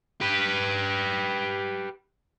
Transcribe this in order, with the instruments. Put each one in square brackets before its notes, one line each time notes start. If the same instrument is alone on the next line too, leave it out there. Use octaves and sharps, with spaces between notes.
[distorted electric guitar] G4 B4